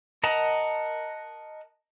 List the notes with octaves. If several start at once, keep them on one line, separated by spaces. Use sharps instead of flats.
A#4 D#5 F#5 A5 A#5